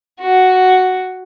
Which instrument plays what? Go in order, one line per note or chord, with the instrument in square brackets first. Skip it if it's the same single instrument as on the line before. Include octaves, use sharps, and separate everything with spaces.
[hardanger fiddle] F#4